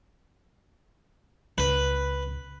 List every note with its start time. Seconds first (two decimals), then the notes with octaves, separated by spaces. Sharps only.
1.58 C#2 B4